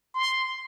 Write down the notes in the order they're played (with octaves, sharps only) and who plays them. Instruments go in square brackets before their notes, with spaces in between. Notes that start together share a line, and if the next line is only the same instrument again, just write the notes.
[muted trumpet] C6